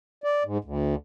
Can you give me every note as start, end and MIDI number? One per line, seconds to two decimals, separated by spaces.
0.24 0.43 74
0.44 0.58 44
0.64 0.95 38